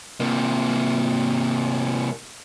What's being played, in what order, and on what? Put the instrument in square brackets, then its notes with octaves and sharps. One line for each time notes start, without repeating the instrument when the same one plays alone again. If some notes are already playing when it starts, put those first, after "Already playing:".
[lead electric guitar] C3 A#3